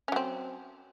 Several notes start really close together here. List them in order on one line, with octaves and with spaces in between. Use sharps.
C#4 F#3 C4